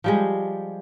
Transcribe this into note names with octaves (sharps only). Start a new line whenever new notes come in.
F3 G3 G#3